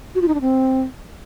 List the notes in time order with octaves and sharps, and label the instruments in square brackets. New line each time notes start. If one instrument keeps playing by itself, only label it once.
[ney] F#4
F4
D#4
D4
C4